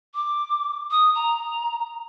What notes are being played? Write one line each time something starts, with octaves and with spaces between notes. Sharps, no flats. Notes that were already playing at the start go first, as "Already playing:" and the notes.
D6
D#6
A#5